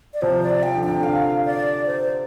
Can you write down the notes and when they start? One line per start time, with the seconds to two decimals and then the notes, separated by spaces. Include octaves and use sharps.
0.14 D5
0.21 C3 F3 C5
0.43 D5
0.63 F3 G5
0.76 D3
0.84 C3 G5
1.00 D3 F5
1.45 D5
1.86 C5